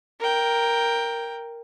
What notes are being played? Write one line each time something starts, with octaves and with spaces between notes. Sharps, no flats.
A#4 G5